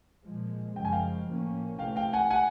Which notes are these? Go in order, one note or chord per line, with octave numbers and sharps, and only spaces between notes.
A#2 F3 G#3
F#2 C#3 F3 G#3 G5
G#5
F5 G5
A2 F3 A#3 C#4
C3 E3 A3 F5 G5
F5 G5
F#5 G#5
F#5 G#5